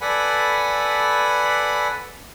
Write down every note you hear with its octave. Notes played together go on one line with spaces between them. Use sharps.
A4 B4 D5 F#5 G#5 B5